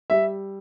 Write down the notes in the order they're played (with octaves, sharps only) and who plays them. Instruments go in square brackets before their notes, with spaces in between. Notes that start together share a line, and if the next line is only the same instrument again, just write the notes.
[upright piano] G3 E5